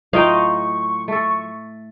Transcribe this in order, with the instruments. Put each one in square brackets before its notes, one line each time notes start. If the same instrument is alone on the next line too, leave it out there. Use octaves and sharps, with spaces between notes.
[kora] A2 D#4 G5 [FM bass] F#3 [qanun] F4 D#5 F5 [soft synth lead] C#6
[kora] A3 A4